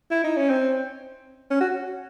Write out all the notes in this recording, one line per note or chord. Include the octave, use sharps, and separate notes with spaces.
E4
D#4
C#4
C4
C#4
F#4